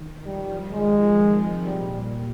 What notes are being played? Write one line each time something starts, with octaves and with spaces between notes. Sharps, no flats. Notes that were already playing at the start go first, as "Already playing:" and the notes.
Already playing: D#3
F3 G3
D#3 G#3
C3
A#2 G3